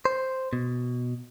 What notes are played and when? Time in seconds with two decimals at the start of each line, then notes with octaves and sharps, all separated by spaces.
0.05 C5
0.53 B2